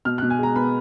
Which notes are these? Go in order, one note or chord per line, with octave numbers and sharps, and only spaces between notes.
B2 F6
F#6
B2
G#5
G#3 A#5
B3 B5